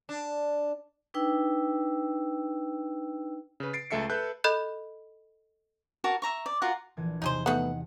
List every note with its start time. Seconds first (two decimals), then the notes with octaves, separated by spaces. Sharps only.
0.09 D4
1.14 D4 D#4 B4 G5 E6
3.60 C#3 B4
3.73 A6 C7 D7
3.90 C#2 A3 A4 E5 C7 C#7
4.10 A4 B4 E5 F#6 G6
4.44 A4 D#5 B5 F#6 G6
6.04 F#4 A#4 A5
6.22 E5 A#5 C#6
6.46 D5
6.62 F4 F#4 A#4 F#5
6.97 A#1 E3 G#6
7.22 E2 C3 D#4 G#4 C5
7.46 A3 B3 D#4 F#5